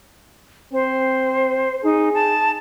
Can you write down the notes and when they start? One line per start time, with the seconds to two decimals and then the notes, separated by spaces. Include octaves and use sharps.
0.73 C4 C5
1.84 D#4 G#4
2.14 A5